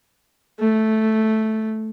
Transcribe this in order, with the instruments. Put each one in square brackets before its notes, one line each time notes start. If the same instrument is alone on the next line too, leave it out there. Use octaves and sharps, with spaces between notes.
[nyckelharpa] A3